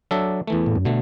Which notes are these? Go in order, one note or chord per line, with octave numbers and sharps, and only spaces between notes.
F#3 D4 A4 E5
E2 E3 A3
A2
F#2
B2 D3 A3